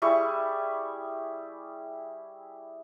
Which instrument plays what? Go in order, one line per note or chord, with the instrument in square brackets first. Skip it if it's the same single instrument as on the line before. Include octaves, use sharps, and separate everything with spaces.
[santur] G3 E4 G#4 C#6